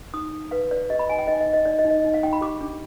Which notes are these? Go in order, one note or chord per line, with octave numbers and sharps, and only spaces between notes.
D#4 D#6
D#4
B4 F5
B4 D5
G4 D#5
B5
D#4 G#5
G5
D#4 D#5
D#5
D#4
D#5
D#4 D5
D#5
D#4
D#5
D#4
F5
D#4 G5
B5
G4 D6
D4